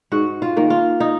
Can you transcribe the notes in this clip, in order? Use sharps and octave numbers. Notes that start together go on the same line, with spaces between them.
G#2 F#4
F4
D#3 A#3
F4
D#4